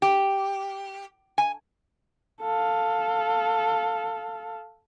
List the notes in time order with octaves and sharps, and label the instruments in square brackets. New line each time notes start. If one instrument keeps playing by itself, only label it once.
[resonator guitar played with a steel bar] G4
G#5
[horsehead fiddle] A4 F5